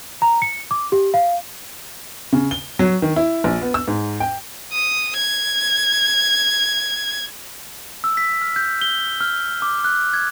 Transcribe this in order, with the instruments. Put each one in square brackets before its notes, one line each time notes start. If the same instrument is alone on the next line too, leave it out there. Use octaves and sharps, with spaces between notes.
[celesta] A#5
C#7
D6
G4
F5
[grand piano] C#3
G7
F#3
D#3
E4
A#1
B3
E6
G#2
G5
[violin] D#6
G#6
[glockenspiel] E6
B6
F6
G6
G7
F6
D6
F#6
G#6